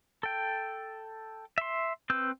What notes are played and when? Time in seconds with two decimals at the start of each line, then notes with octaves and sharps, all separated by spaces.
0.23 A4 G5
1.58 E5 C6
2.10 C4 B4 E6 G6